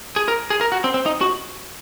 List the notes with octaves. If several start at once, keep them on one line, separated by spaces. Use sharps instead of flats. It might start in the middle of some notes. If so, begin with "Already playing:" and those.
G#4
A#4
G#4
A#4
F#4
C4
C4
D#4
F#4